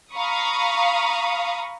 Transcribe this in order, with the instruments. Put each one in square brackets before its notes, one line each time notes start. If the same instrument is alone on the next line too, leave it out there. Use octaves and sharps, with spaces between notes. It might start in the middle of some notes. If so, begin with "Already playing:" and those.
[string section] F5 A#5 B5 C#6 D#6